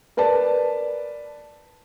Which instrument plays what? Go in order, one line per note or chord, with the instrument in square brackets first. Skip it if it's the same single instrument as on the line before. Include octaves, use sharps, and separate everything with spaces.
[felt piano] A#4 B4 D5 A5